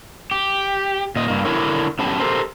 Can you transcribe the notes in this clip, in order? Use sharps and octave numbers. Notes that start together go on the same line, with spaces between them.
G4
A#2 D#5
G2 A#3
D3 D4 E4 G4 A#4 C#5
F#2 A2 F#3 B3 G4 A5
G4 A4 A#4 C5